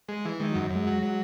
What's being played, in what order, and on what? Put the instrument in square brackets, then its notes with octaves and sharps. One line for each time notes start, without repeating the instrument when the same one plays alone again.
[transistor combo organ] G#3
E3
[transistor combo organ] D#3 [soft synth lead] G#3
[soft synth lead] F#3
[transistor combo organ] F#2
[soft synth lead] F#3
[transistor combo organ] F#2 [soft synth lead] G#3
[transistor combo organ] F#3
F#3